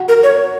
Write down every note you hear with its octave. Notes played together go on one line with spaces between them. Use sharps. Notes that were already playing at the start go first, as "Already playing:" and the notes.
Already playing: F#4
A#4
C#5